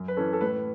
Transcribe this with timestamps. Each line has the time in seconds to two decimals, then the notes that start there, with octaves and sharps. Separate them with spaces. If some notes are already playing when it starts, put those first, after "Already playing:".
Already playing: F#2
0.08 B4
0.17 E3 C#4 A4
0.33 A4
0.41 A2 B4